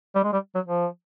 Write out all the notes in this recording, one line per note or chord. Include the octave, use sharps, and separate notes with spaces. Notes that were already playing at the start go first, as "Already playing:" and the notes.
G3
G#3
G3
F#3
F3